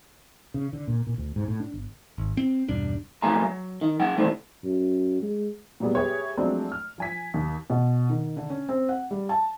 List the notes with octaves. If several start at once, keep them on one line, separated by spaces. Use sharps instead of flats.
C#3
D3
A#2
A#2
D2
G#2
A2
D4
G1
G#1
C4
E1 G2 G3 D4
F2 F#3 A3 A#4 G#5 A#5
F#3
D#3
F#2 F#3 F#5 G5
D#3 E3 G#3 A3 C4 D4
F#2
G#3
A#2 F#3 G3 B3 G#4
G4 G#4 B4 C#5 E5
F3 F#3 G#3 A3 C4 D4
F6
F3 G#5 B6
D#2
B2
D#3
D3
C#4
C4
F#5
G3
A5